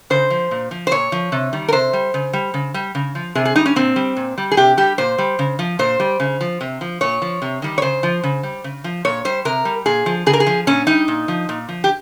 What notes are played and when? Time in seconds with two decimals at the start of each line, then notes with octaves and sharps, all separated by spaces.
0.10 C#3 C5
0.30 F3
0.51 A#2
0.71 F3
0.87 C5
0.91 A#2 C#5
1.12 F3
1.32 C3
1.53 D#3 G3
1.68 A#4
1.73 C3 C5
1.93 G3
2.14 C#3
2.33 G3
2.54 C#3
2.74 G3
2.95 C#3
3.15 F3
3.35 C3 G#4
3.45 G#4
3.56 G3 D#4
3.66 C#4
3.76 A#2 C4
3.96 G3
4.16 A#2
4.38 G3
4.51 G#4
4.57 C3 G4
4.77 G3 G4
4.98 A#2 C5
5.18 G3
5.39 C#3
5.59 F3
5.79 A#2 C5
6.00 G3
6.20 C#3
6.41 F3
6.61 C3
6.81 F3
7.01 A#2 C#5
7.22 F3
7.42 C3
7.62 D#3 G3
7.78 C#5
7.82 C#3 C5
8.03 F3
8.23 C#3
8.43 G3
8.64 C#3
8.84 F3
9.05 A#2 C#5
9.25 G3 C5
9.45 C3 A#4
9.65 G3
9.86 A#2 G#4
10.06 F3
10.26 C#3 G#4
10.33 A#4
10.40 G#4
10.47 F3
10.67 A#2 C#4
10.87 G3 D#4
11.08 A#2
11.28 F3
11.49 A#2
11.69 F3
11.84 G4